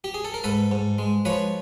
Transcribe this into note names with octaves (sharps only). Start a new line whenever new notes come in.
G4
G#4
A4
A#4
G#2 A4 B4
G#2
G#3
F3 B4 C#5